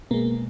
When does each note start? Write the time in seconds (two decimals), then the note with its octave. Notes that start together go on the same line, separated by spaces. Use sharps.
0.11 B2 G#3 A#3